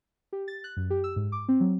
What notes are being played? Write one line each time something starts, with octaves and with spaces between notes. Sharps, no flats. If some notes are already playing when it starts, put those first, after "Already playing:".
G4
A6
F#6
F#2
G4
E6
G#2
D6
C4
F#3